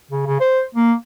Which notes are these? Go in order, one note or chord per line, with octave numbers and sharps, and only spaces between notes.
C#3
C#3
C5
A#3